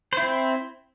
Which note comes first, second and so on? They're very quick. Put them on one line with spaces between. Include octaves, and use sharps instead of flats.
C5 E4 C4